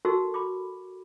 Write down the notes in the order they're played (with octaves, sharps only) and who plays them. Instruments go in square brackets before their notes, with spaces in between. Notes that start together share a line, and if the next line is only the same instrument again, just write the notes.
[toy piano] D#4 F#4 A4 A#4 C#6 E6
B5 D6